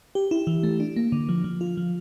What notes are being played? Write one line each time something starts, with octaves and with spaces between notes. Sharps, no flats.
G4
E4
E3
A3
D4
A#3
D3
F3
F3
F4
F3